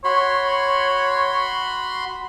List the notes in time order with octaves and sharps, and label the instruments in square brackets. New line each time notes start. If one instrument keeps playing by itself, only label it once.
[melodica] F#4 B5 C6 [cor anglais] C#5